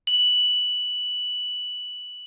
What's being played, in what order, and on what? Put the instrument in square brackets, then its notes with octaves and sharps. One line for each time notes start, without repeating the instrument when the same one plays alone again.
[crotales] F#7